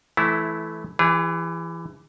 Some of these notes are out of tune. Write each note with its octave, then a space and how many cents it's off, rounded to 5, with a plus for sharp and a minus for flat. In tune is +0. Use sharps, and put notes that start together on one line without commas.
E3 +0 A3 -20 E4 +0
E3 +20 G#4 -35